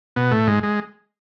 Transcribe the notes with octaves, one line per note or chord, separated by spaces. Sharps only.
B2 B3
A2 A3
G#2 G#3
G#3